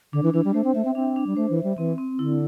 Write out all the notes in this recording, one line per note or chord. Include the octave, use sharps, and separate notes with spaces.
D3 D4
E3
E3 D4
G3
A3 C5
C4
A3 E5
C4
C4 D4
D4
G3
A3 C5
E3
E5
G3
E3 C4
C4
D3 E4